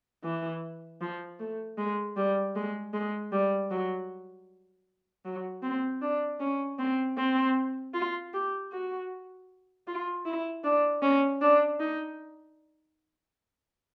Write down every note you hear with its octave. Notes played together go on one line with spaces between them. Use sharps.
E3
F3
A3
G#3
G3
G#3
G#3
G3
F#3
F#3
C4
D4
C#4
C4
C4
F4
G4
F#4
F4
E4
D4
C#4
D4
D#4